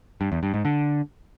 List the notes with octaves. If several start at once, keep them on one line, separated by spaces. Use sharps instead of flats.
G2
E2
G2
G#2
D3